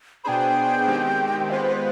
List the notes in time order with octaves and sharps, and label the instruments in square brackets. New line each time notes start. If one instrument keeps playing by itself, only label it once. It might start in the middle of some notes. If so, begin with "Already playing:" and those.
[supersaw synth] B2 B3 D4 G#4 C5 [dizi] G5 B5
[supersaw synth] D#3 G#3 C4 G4
[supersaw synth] G#3 B3 F4 B4 [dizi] C5